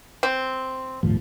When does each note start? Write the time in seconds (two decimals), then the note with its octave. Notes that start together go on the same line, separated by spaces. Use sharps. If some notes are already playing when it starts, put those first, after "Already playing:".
0.23 C4
1.03 G1 D#2 A2 F3